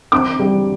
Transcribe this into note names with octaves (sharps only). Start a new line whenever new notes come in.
C4 D6
G3